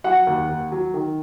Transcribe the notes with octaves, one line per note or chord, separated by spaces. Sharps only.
F#3 F#5
D#2
D#2
F#3
D#3